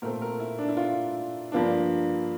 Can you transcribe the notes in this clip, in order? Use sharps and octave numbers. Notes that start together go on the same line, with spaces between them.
A#2 A3 C4 A#4
A#4
E4
D4
E4
F4
G2 F3 A#3 D4